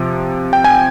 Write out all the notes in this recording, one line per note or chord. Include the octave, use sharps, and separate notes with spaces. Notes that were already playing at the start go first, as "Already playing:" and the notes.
Already playing: C3 F3
G5
G#5